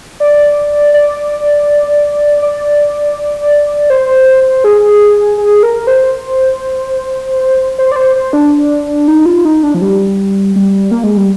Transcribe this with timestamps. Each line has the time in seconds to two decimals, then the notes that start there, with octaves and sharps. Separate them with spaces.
0.20 D5
0.94 D5
2.42 D5
3.90 C5
4.64 G#4
5.37 G#4
5.63 A#4
5.87 C5
7.78 C5
7.92 D5
7.96 C5
8.16 C5
8.33 D4
9.08 D#4
9.26 F4
9.45 D#4
9.63 D4
9.74 F3
9.82 G3
10.56 G3
10.91 A#3
11.04 G#3
11.17 G3